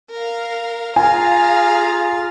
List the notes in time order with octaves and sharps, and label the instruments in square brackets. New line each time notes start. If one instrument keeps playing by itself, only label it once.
[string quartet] A#4 F5
[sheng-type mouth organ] F4 [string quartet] G#4 F5 A#5 [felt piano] G#5